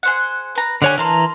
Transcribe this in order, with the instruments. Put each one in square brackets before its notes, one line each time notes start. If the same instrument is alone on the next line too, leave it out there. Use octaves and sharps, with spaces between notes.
[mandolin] G#4 C5 F#5
B4 A#5
[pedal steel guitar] D3 C#5 G#5 [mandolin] G4 F#5
[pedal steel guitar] E3 A#5 [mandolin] A#4 A5 C6